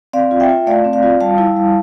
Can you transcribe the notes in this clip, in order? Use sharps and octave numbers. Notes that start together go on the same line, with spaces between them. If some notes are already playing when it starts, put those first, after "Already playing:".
C4 D5 F5
F4
E5 G5
F4
A3 D5 F5
C4
D5 F5
F4
G3 F5 A5
E4
G3